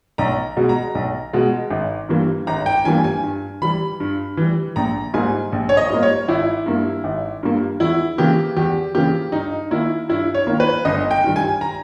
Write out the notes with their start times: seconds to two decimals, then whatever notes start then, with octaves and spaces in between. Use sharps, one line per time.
0.18 B1 A#5
0.57 B2 G#3
0.69 A#5
0.95 B1
1.33 B2 G#3
1.70 G#1
2.09 G2 E3 G3 A#3
2.47 G#1 A#5
2.66 G5
2.85 G2 E3 G3 A#3 G#5
3.04 G#5
3.23 G2
3.62 E3 G3 B5
4.00 G2
4.37 E3 G3
4.76 A#1 A#5
5.14 G#2 G3 A#3 G#5
5.52 A#1
5.69 C#5
5.77 D#5
5.90 G#2 G3 A#3
6.03 C#5
6.28 G#1 E4
6.66 G2 G3 A#3
7.04 G#1
7.43 G2 G3 A#3
7.80 E2 E4
8.18 C#3 E3 A#3 G4
8.56 E2 G4
8.94 C#3 E3 A#3 G4
9.32 G2 D#4
9.71 D#3 A#3 E4
10.09 G2 E4
10.35 C#5
10.47 D#3 A#3
10.60 B4
10.85 G1 D#5
11.11 G5
11.24 G2 D#3 G3
11.36 G#5
11.61 A#5